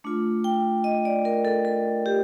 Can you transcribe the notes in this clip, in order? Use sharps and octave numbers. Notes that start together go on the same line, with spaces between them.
A3 D4 F4
G5
D#5
D5
A#4
A4
A4
G4